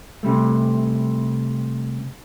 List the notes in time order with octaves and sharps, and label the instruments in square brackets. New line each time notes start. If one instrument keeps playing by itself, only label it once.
[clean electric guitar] C3 G3 A3